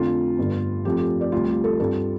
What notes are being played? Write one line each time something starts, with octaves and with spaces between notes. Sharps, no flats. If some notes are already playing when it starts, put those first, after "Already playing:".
Already playing: F2 D3 A3 F4
G1 G2 D3
F2 F3 A3 F4 G4
G4
D5
D2 C3 G3 F4
G4
A4
G2 G3 C4 F4 A4